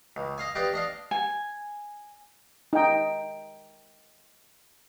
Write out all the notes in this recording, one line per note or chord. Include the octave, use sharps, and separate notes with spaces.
C#2
D#5 F5 G#5
G4 B4 D5 D#5 F5
D4 D#5 F5
G#5
D#4 G5